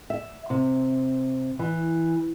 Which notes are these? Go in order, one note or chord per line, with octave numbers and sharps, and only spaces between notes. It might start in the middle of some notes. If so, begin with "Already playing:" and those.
E5
C3
E3